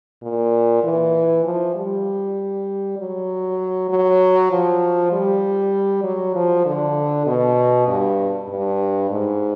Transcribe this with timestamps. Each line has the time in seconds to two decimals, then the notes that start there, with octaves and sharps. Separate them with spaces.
0.23 A#2
0.83 E3
1.45 F3
1.75 G3
2.98 F#3
3.89 F#3
4.51 F3
5.12 G3
6.04 F#3
6.35 F3
6.65 D3
7.26 B2
7.88 G2
8.49 G2
9.10 G#2